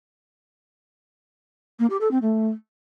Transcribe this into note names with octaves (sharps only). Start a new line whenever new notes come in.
A#3
G4
A4
C4
A3